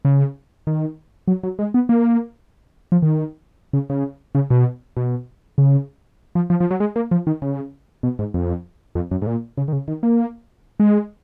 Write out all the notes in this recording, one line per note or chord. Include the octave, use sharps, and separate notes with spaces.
C#3
D#3
F#3
F#3
G#3
B3
A#3
F3
D#3
C#3
C#3
C#3
B2
B2
C#3
F3
F3
F3
F#3
G#3
A#3
F3
D#3
C#3
B2
G#2
F2
F2
F#2
G#2
A#2
C#3
D#3
C#3
D#3
A#3
G#3